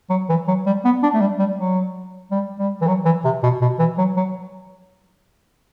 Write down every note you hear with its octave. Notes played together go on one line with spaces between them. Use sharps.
F#3
E3
F#3
G3
B3
D4
A3
G3
G3
F#3
G3
G3
E3
F#3
E3
C3
B2
B2
E3
F#3
F#3